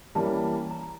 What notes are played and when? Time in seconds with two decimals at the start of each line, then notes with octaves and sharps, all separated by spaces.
0.15 E3 G3 A#3 C#4 A5
0.71 A#5